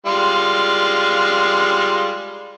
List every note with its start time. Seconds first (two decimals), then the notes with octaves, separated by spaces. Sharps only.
0.06 G3 G#3 F4